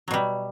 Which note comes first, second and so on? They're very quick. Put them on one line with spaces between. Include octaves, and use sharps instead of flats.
F#3 B2 G3